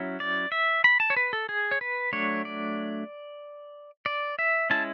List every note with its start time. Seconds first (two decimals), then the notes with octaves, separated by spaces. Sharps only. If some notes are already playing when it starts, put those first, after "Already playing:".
Already playing: F#3 C#4 E4
0.20 D5
0.52 E5
0.84 B5
1.00 A5
1.10 C#5
1.17 B4
1.33 A4
1.49 G#4
1.71 C#5
1.81 B4
2.13 F#3 A3 D4 C#5
2.45 D5
4.06 D5
4.39 E5
4.70 G#3 C#4 E4 A5